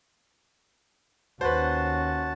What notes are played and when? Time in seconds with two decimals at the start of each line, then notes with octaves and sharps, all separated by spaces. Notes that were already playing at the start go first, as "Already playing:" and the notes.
1.41 D#2 C#4 F#4 B4 C5 A5